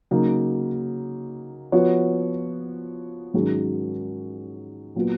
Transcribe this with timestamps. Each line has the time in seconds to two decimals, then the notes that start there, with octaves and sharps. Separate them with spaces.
0.11 C#3 F#3 A#3 D#4
1.72 F3 B3 F#4 C#5
3.34 G#2 D#3 F#3 C#4 G#4
4.95 A#2 F#3 B3 F4